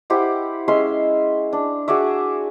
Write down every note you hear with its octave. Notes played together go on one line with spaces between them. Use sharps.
E4 G4 C5 F#5
G#3 C#4 E5 C6
D4
F#4 G#4 D5 E5